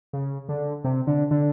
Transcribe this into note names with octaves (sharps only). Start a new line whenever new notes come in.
C#3
D3
C3
D3
D3